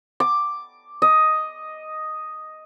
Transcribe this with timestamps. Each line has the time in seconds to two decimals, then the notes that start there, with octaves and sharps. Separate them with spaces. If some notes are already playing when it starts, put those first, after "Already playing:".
0.20 D6
1.02 D#5